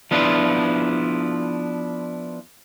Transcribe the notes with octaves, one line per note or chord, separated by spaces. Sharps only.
F3 B3 D4 E4 F4